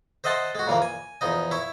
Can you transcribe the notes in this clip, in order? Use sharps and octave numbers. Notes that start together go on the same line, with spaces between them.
C5 D#5 E5 F#5 A5 C6
G#3 F#4
A#2 C#3 E3 F3 A#3
G#5
E2 F3 D#4 D#5
E4 C#5 E5